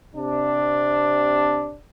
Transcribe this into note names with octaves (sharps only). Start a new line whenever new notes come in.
C3 D4